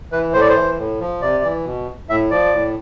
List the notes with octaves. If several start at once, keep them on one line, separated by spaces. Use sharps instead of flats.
E3 B4
A2 C5
D5
C5
E3
A2
F3
C3 D5
E3
B2
A2 E5
F3 D5
A2